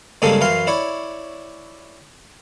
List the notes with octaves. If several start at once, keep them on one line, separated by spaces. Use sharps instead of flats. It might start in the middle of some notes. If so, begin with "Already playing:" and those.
G2 C#3 G#3 A#3 G#4 A4
F#2 E3 F5 C6
E4 C#5 D5